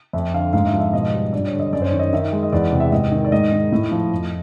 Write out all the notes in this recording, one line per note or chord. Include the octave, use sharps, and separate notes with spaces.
F2 E5
D3 F5
G#2 F5
E5
F3
E5
B2 D#5
G3
G2 D5
C#5
D3
D#5
F#2 D5
C5
C#5
D#3
D#5
D#3 E5
G#3
D#5
E2 D5
C3
E5
G#2 D#5
D#3
D5
G#2 D#5
D#3
A2
F3
F2